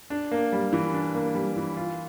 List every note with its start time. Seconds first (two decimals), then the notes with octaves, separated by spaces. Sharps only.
0.10 D4
0.32 A#3
0.52 G3
0.73 E3
0.94 D4
1.15 A#3
1.35 G3
1.56 E3
1.77 F4